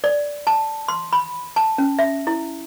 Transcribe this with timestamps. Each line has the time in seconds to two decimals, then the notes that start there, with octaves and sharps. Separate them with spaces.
0.04 D5
0.47 A5
0.88 C6
1.13 B5
1.56 A5
1.78 C#4
1.99 E5
2.27 E4